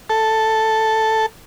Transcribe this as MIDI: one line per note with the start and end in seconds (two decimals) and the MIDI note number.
0.09 1.26 69